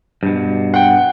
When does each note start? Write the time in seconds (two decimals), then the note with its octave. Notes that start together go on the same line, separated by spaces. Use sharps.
0.23 G2 B2
0.74 F#5 G5